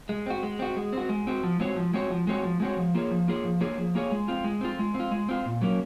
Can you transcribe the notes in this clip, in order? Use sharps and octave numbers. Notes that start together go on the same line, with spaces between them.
G#3
C4 F#4
G#3
C4 F#4
G#3
C4 F#4
G#3
C4 F#4
F3
G#3 C4 F#4 C#5
F3
G#3 C4 F#4 C#5
F3
G#3 C4 F#4 C#5
F3
G#3 C4 F#4 C#5
F3
A#3 F4 G#4 C#5
F3
A#3 F4 G#4 C#5
F3
A#3 F4 G#4 C#5
F3
A#3 F4 G#4 C#5
G#3
C4 F4
G#3
C4 F4
G#3
C4
F4
G#3
C4 F4
A#2
F#3 A#3 C#4